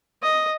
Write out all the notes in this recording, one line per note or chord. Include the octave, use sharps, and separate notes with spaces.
D#5